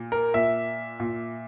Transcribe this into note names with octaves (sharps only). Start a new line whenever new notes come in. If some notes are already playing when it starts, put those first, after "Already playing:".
Already playing: A#2
A#4
A#2 E5
A#2